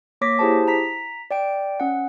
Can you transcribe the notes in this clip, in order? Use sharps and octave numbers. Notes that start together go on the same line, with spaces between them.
A#3 C#5 D6 A#6 B6
E4 G4 G#4 C5 A5
A#5 B6
D5 G5 D7
C#4 F#5